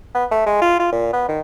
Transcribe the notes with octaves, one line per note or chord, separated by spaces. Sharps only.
B3
A3
G#3
F4
F4
A#2
B3
D#3